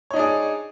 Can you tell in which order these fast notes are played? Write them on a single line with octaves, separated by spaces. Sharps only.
C#5 D#4 D4 G#4